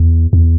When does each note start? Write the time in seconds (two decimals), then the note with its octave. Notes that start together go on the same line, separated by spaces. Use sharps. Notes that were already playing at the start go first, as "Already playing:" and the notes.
Already playing: E2
0.33 E2